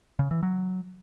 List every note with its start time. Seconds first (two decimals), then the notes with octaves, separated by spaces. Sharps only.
0.19 C#3
0.31 E3
0.43 F#3